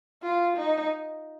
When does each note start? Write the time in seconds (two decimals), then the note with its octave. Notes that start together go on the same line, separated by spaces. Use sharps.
0.22 F4
0.57 D#4